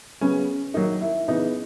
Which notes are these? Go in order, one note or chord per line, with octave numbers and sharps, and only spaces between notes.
C#3 F#3 B3 C#4
D#3 F#3 A#3 D#4
E4
C#3 E3 B3 D#4